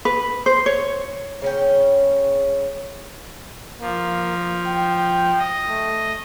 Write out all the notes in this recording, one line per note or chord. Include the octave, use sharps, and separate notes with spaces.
B4
C5
C#5
C#3 C#4 G5
F3 A#3
G5
D#5
A3